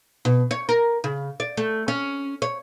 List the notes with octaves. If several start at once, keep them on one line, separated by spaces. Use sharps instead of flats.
B2
C#5
A#4
C#3
D5
A3
C#4
C#5